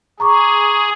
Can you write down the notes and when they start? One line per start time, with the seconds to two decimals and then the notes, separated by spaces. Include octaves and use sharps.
0.20 G#4 A#5 C#6 D6